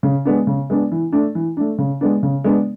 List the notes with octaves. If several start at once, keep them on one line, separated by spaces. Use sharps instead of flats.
C#3
G#3 B3 D4
C#3
G#3 B3 D4
E3
A3 D4
E3
A3 D4
C#3
G#3 B3 D4
C#3
G#3 B3 D4